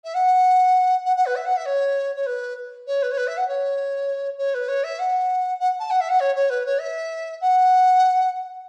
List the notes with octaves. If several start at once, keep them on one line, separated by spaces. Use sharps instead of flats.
E5
F#5
F#5
F#5
B4
E5
F#5
E5
C#5
C#5
B4
C#5
B4
C#5
B4
E5
F#5
C#5
C#5
B4
C#5
E5
F#5
F#5
A5
F#5
E5
F#5
C#5
C#5
B4
C#5
E5
F#5